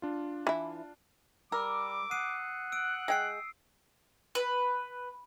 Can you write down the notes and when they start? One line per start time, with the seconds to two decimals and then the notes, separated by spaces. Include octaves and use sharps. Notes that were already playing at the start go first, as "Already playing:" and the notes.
0.02 D4 F4
0.47 E3 E4
1.52 G3 A#4 D6 E6
2.11 F#5 D#6 C7 D#7
2.72 E6 F#6 D7
3.08 G#3 G5 E6 C7
4.35 B4